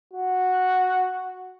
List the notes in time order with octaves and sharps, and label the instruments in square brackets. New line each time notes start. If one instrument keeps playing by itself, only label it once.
[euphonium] F#4